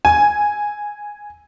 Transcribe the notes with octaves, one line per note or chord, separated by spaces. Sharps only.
G#5